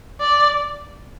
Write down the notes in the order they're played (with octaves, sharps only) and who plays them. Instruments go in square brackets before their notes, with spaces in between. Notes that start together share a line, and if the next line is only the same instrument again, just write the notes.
[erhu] D5